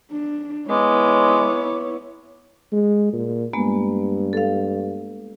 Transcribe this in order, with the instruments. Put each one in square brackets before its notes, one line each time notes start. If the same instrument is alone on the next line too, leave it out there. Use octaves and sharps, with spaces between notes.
[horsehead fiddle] D4
[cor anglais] G#3 [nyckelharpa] B3 D6 [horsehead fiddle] E4 C#5
[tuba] G#3
A#2
[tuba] G2 [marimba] G#3 A#3 B3
[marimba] A4 F5